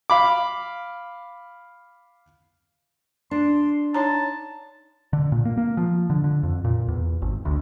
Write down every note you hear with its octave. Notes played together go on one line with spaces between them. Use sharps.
F5 B5 D6
D4 C6
D#4 C#5 A5 A#5
D3
A#2
A#3
A#3
F3
D3
D3
F2
A#2
E2
G#1
D2